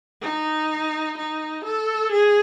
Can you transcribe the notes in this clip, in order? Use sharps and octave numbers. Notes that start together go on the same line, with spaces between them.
D#4
D#4
A4
G#4